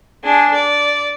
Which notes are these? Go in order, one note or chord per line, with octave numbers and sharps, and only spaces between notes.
D4 G#4
D5